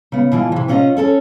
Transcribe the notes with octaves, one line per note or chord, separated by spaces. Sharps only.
C#3 B3
B2 E3 F4
C3 E3
C3 C#4 F4 B4 D#5
C#4 A4 A#4 C#5